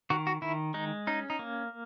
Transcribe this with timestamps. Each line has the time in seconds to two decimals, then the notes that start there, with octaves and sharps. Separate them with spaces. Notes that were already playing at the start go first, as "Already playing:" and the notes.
0.10 D#3 F#4
0.27 F#4
0.42 D#3 E4
0.74 G#3 D#4
1.07 C#4 D#4
1.30 D#4
1.39 A#3